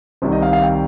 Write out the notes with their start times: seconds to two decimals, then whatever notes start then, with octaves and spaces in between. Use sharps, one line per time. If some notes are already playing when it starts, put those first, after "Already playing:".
0.22 C2 C3 D#3 C5
0.32 D#5
0.42 F5
0.53 F5
0.64 G5